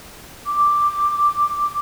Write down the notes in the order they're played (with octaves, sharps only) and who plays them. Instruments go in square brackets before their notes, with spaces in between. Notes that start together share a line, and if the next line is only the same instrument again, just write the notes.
[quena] D6